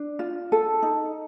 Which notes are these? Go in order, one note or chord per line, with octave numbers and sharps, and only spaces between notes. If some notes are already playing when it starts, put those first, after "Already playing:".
Already playing: D4
F4
A4
D#4